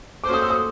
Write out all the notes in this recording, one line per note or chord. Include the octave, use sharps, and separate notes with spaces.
A#3 C#4 F#4 A4 C5 D6
D#6
E6
D#6